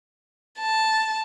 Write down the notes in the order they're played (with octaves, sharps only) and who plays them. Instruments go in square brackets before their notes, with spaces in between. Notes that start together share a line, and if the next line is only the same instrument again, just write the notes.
[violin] A5